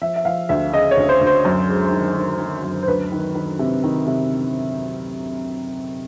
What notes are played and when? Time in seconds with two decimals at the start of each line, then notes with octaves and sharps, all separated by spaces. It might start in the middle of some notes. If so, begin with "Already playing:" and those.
0.01 F3 E5
0.16 E5
0.25 F3 F5
0.49 D2 E5
0.73 C#3 D#5
0.91 C#5
0.97 D2
1.09 C5
1.21 D2
1.27 C5
1.45 F#2
1.68 G#3
1.92 D#3
2.16 D#3
2.40 D#3
2.64 F#2
2.83 C5
2.88 D2 B4
3.12 D#3
3.35 D#3
3.59 C3
3.84 D#3
4.07 C3